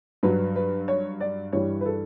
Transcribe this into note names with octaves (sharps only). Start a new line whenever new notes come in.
G2 F#3 B4
B4
C#5
D5
G2 E3 G3 C#5
B4
A4